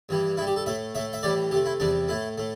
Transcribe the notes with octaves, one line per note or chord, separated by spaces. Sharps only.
G2 E3 G3
G2 G3 E4
G4
A4
A2 A3 E5
A2 A3 E5
E5
A2 E3 G3 D5
C3 A3 G4
E4
E2 C3 G3 D4
A2 A3 E4
A2 A3